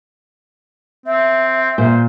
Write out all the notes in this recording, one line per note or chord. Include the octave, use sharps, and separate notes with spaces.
C4 E5
A#2 C5